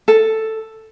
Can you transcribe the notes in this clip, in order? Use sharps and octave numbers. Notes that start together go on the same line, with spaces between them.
A4